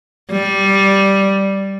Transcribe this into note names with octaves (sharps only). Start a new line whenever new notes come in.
G3